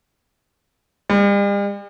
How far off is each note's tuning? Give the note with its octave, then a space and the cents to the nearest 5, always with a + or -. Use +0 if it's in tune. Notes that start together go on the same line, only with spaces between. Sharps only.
G3 +45